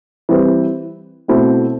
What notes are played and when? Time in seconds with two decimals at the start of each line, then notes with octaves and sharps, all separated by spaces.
0.29 E3 G3 C4 G4 B4
1.28 B2 A3 C4 E4